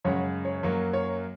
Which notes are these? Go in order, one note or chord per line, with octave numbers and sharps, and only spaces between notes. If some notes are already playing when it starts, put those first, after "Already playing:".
F#2 C#3 G#3 C#5 F#5
C#5
F#2 F#3 A#3 C#5
C#5